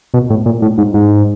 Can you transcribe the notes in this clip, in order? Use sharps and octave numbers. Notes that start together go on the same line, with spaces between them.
B2
A2
A#2
A2
G#2
G#2